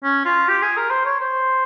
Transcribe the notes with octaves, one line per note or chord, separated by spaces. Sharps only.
C#4
F4
G4
G#4
A#4
C5
C#5
C5